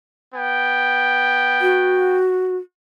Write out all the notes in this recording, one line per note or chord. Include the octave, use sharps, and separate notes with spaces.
B3 G5
F#4